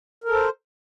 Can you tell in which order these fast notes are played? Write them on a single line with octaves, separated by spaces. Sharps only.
A#4 A4 C5